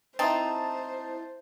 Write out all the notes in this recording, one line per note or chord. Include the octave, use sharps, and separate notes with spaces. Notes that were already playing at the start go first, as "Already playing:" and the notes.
C4 D#4 E4 C5 A5